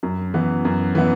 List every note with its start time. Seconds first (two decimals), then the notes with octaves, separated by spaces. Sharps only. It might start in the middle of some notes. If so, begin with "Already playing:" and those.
0.03 F#2
0.34 E3 B3
0.65 F#2
0.95 E3 B3